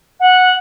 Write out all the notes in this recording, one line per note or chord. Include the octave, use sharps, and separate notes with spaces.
F#5